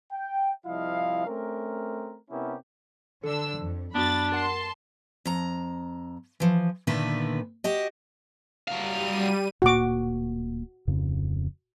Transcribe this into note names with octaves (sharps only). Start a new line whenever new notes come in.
G5
C2 F3 E4 D#5 F5
A3 C4 C#4 A#4
C3 B3 C#4 E4 G4 A#4
D3 D4 A4 E6
F2
F#2 B3 D4 F#4 B5 A6
A#4 F#5 A5 C6
F2 A#5
E3 F3
A#2 D3 D#3 A3 B3 B4
F#4 G4 D#5
F#3 G3 F5 D#7
D1 A#2 A#3 F#4 D6
D1 F2 C#3